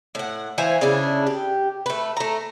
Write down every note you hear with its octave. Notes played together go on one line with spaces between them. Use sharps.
A2 F#5
E3 C5 F5 G#5
C#3 C#4 D4 E4
G4
A3 B4
A3 A#5